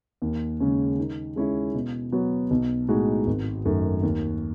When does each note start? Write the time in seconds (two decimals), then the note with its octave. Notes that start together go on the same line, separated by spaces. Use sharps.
0.22 D#2
0.60 C#3 G#3 C#4
0.99 D#3
1.36 G#3 C#4 E4
1.75 B2
2.12 F#3 B3 F#4 C#5
2.51 B1
2.88 A2 G#3 D#4 F#4
3.27 G#1
3.65 F#2 D#3 A3
4.03 D#2